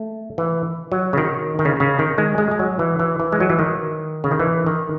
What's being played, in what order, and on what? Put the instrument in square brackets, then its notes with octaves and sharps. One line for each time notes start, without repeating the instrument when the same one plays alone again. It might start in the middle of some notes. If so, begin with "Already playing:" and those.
Already playing: [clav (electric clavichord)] A3
E3
F#3
C#3
D#3
D#3
C#3
C#3
D#3
G#3
G#3
G#3
F#3
E3
E3
E3
G#3
F#3
E3
D#3
C#3
D#3
E3
D#3